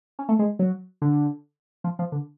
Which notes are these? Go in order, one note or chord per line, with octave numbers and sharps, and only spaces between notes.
C#4
A3
G#3
F#3
D3
F3
F3
D3